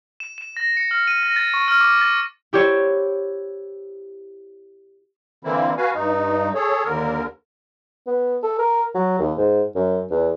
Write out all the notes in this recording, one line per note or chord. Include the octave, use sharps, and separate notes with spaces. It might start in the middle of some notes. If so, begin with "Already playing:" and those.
E7
E7
A#6
C#7
F6
D#7
A#6
A6
C#6
F6
D6
A6
E4 G4 C5 C#5
D3 E3 A#3 C4 E4
F#4 B4 F5 G#5
G2 D#4
G#4 A4 C#5
D#2 D3 A#4
B3
A4
A#4
F#3
D#2
G#2
F#2
E2